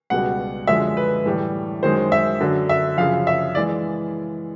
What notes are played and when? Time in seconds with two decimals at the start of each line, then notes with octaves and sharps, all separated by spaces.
0.10 C#2 B2 G3 F#5
0.67 F#2 D3 F3 G#3 E5
0.97 B4
1.26 A2 E3 G3
1.83 F#2 D#3 G#3 C5
2.12 E5
2.41 F#2 D3 F#3
2.69 E5
2.97 F#2 C#3 F3 F5
3.27 E5
3.55 E3 G#3 D5